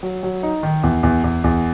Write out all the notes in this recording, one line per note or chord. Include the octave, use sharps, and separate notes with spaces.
F#3
F#3
D#4
D#3
E2
E2
E2
E2